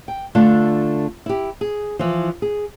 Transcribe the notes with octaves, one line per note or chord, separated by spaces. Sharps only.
G5
D3 A3 D4 F4
E4 G4
G#4
E3 F3
G#4